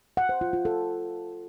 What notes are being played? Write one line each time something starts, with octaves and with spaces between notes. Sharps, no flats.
F#5
C5
F4
F4
A4